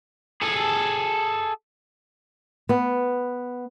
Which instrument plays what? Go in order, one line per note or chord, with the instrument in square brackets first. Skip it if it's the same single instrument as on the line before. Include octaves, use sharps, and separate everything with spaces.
[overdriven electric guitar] G#4 A4
[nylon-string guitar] B3